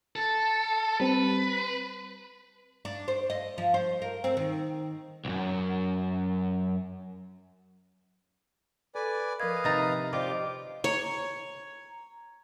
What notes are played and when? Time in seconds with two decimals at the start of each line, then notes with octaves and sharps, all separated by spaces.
0.16 A4
1.00 G3 C4 B4
2.85 D4
3.08 C5
3.30 D#5
3.58 F3
3.74 C5
4.02 A#4
4.24 C4
4.37 D#3
5.25 B1 F#2
8.95 A4 B4 D5 G#5
9.40 F3 A#4 B4 D#5 F5 G#6
9.64 C3 D#4 A#5 A6
10.13 F4 G4 C5 D5 D#5 D6
10.84 C#5 A#5